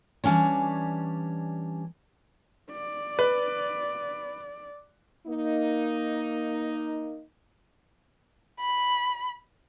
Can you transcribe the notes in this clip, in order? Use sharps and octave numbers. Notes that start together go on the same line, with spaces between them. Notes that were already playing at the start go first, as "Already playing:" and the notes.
E3 G3 A#3 C#4 D4 C#5
D5
B4
A#3 D#4
B5